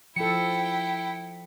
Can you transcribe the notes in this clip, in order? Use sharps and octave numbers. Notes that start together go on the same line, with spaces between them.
F3 E4 A4 G5 C#7